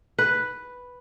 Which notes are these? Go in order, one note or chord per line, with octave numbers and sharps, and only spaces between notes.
B4